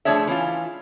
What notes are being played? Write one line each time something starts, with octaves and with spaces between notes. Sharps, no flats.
F3 A3 D4 G#4 C#5 E5
E3 C#4 F4